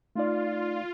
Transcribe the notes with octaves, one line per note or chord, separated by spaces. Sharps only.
A3 D#4 F4 D5